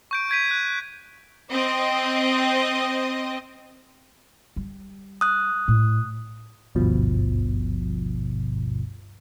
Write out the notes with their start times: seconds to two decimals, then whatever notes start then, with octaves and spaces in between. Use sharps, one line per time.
0.11 C#6 G6 D7
0.30 G6 G#6 B6 D#7
0.51 F#6
1.50 C4 D#5
4.56 G3
5.21 D#6 F#6
5.68 A2
6.75 G#1 D2 G2 B2 F3